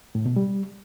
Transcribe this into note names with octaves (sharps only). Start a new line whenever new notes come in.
A2
B2
G3